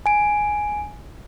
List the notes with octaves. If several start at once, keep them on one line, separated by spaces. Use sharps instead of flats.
G#5 D7